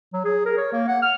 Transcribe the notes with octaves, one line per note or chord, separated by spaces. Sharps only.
F#3
G#4
A#4
C#5
A#3
F#5
F6